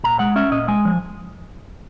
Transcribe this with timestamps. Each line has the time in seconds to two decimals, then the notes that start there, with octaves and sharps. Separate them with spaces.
0.04 A#2 A#5
0.19 G#3 F#5
0.36 C#4 E5
0.51 A#2 D#5
0.68 G#3 G#5
0.85 F3